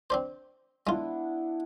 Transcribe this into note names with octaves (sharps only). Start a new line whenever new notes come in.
C4 D4 C5
G#3 B3 D4 E4 F4